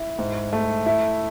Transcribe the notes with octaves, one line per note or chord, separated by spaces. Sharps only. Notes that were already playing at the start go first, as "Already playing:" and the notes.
Already playing: E4
G#2
A3
E4